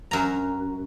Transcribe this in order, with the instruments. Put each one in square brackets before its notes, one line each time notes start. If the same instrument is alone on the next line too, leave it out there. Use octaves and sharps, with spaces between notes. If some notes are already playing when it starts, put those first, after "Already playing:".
[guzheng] F#2 A#5